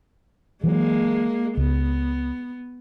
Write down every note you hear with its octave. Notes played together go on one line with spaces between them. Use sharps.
E3 F#3 G#3 A#3
C#2 B3